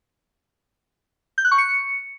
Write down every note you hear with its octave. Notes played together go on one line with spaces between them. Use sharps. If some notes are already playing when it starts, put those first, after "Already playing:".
G6
F#6
C#6
C#7